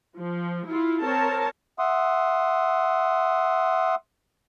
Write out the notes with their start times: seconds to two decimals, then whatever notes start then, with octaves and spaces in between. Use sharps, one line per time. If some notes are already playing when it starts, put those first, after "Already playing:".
0.17 F3
0.68 E4 F4
1.02 C4 A#4 C#5 A5
1.79 E5 F#5 C6 D#6